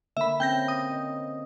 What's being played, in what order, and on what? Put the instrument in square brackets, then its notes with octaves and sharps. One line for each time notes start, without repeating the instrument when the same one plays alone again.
[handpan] D3 A#3 A#4 [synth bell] E5 B5
[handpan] C4 C#4 [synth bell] G5 G6 A#6
[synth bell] D#6
[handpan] D#5